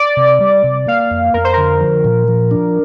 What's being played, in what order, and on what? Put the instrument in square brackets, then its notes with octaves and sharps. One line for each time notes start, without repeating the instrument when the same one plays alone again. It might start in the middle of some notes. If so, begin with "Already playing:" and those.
Already playing: [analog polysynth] D5
[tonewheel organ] C3
G3
C3
[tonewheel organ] A#3 [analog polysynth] F5
[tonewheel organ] F2
[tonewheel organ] F2 [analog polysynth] A#4
[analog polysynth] C5
[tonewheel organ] D3 [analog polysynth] A#4
[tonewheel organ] F3
A#2
F3
D4